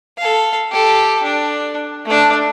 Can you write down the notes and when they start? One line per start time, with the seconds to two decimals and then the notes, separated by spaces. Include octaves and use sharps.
0.18 A4 F5
0.72 G4 A4
1.23 D4
2.06 A3 D4